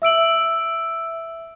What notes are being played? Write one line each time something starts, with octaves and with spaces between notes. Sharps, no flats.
E5 E6 D7 F#7